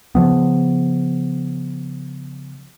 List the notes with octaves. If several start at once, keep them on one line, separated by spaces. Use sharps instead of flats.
C#3 F3 B3